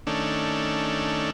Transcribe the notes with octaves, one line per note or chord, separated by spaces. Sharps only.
D#3 A3 C#4 D4